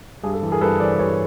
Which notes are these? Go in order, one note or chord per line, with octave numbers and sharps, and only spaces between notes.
G2 G#4
A4
E3
G#4 A#4
G2 A4 B4
E3 C5 D5
G2 B4 C#5